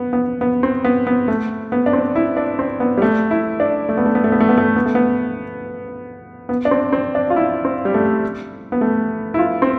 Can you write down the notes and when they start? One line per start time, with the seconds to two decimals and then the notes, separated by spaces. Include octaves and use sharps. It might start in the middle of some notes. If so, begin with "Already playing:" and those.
Already playing: B3
0.13 B3
0.41 B3
0.63 C4
0.84 B3
1.07 B3
1.28 A3
1.72 B3
1.86 D4
1.93 C4
2.15 E4
2.37 D4
2.59 C4
2.80 B3
2.98 G3
3.02 A3
3.31 E4
3.60 D4
3.89 A3
3.97 B3
4.06 A3
4.15 B3
4.24 A3
4.32 B3
4.40 A3
4.49 B3
4.58 A3
4.76 B3
4.86 A3
4.95 B3
6.49 B3
6.65 D4
6.71 C4
6.93 C4
7.15 D4
7.30 F4
7.36 E4
7.65 C4
7.85 G3
7.94 A3
8.72 B3
8.81 A3
9.34 E4
9.39 F4
9.62 C4